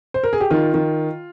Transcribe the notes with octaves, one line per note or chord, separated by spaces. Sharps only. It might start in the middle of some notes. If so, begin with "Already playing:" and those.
C5
A#4
G#4
G4
D#3 F4
D#3